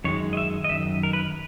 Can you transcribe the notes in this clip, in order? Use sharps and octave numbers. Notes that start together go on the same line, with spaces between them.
F#2 D#3 G#3 C#5
D#5
E5
D#5
F#2 D#3 E5
A#4
B4